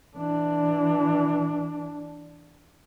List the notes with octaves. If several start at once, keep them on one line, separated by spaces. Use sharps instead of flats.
E3 D4